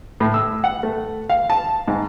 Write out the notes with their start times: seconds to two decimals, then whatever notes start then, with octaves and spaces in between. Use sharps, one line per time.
0.20 A2
0.34 E6
0.64 F#5
0.83 A3
1.29 F5
1.50 A5
1.88 G#2